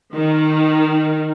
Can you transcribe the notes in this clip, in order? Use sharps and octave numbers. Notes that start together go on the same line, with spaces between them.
D#3